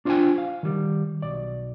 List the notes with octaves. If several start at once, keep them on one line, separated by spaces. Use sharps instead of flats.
D4 F4 C5 D5 G5 G#5
F5
D#3 G3
B1 D5